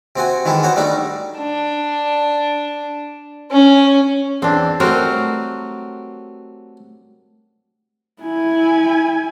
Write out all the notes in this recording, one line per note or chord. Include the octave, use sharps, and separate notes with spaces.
C3 C4 F#4 G#5
D#3 E3 G#3 E4 A4
B3 F#4 C5 C#5
G3 A3 D4 D#4
D4
C#4
E2 C4 D4
F#3 G3 A3 C4 F#4 A#4
E4 G#5